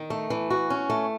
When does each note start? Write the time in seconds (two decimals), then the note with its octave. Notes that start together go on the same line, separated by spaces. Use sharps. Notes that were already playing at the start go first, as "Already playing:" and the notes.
Already playing: D#3
0.10 A3
0.30 E3
0.50 F#4
0.70 C#4
0.90 A3